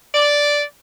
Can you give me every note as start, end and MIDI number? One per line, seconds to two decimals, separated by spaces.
0.15 0.61 74